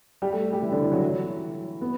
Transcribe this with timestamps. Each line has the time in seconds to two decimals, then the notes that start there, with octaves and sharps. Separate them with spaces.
0.22 G3 G4
0.32 A3 A4
0.52 G3 G4
0.62 E3 E4
0.72 D3 D4
0.82 E3 E4
0.92 F#3 F#4
1.01 E3 E4
1.81 B3